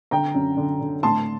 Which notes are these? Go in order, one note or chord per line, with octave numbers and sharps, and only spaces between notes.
D3 G5 A#5
F#2
D3
D3
A2 A5 C6